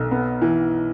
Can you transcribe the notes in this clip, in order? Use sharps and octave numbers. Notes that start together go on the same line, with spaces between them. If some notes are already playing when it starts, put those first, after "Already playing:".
Already playing: B1 A4
B3
E3